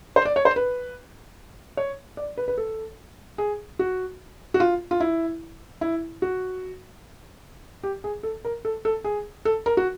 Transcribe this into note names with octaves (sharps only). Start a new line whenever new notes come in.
C5
D5
C#5
C5
B4
C#5
D5
B4
B4
A4
G#4
F#4
F#4
F4
F4
E4
E4
F#4
G4
G#4
A4
A#4
A4
A4
G#4
A4
A#4
F#4